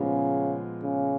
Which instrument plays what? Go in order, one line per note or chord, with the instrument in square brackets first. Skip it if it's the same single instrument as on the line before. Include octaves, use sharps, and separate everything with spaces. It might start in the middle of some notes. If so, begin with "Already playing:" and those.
Already playing: [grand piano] A#2 F3 G#3 B3 [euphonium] C#3
[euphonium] C#3